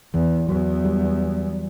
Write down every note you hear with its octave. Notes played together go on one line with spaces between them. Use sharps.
E2 E3
E2 F#3
G3